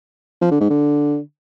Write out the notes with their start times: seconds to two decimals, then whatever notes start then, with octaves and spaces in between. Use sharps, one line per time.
0.41 F3
0.51 D3
0.60 G#2
0.70 D3